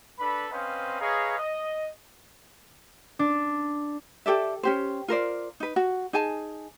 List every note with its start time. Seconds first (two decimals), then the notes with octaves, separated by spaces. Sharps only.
0.19 D4 A4 B4 B5
0.51 C4 C#4 B4 C5 D#5 F5
1.01 G#4 B4 C#5 D#5 F5 A#5
1.39 D#5
3.19 D4
4.26 G4 A4 D5 E5
4.63 C#4 G4 C5
5.08 F4 A#4 C5 D5
5.60 D#4 B4
5.76 F#4
6.13 D#4 G#4 G#5 A5